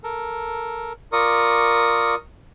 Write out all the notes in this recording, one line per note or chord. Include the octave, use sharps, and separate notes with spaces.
A4 A#4
F4 A#4 D5 C#6 D#6